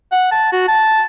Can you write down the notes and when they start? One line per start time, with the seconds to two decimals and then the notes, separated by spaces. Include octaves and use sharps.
0.12 F#5
0.31 A5
0.52 F#4
0.68 A5